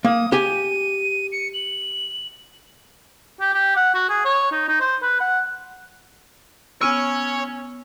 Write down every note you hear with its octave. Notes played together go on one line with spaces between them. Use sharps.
A#3 D#6
G4 G#5 D#7
C#7
F#7
G4
G4
F#5
F#4
G#4
C#5
D#4
D#4
C5
B4
F#5
B3 C#4 C#5 E6 F6 D#7